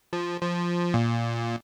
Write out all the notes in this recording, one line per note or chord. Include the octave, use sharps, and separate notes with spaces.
F3
F3
A#2